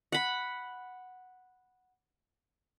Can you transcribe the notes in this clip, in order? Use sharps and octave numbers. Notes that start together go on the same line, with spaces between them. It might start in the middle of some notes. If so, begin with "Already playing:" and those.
F#5 B5